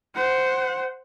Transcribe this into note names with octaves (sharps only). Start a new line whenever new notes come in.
C5 F#5